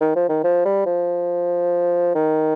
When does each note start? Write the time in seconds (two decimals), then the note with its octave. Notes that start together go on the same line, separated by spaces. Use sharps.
0.01 D#3
0.16 F3
0.29 D#3
0.44 F3
0.65 G3
0.86 F3
2.15 D#3